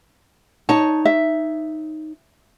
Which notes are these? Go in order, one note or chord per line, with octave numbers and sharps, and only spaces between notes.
D#4 C#5 A5
E5